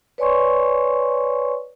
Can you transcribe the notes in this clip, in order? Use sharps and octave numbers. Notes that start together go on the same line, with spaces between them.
B4 C#5 D5 G#5 C6 C#6